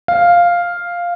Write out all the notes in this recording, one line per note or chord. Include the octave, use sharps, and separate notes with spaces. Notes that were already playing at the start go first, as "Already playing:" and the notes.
F5